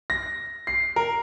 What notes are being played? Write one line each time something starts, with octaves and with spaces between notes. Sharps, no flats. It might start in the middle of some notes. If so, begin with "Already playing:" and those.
A#6
C7
A#4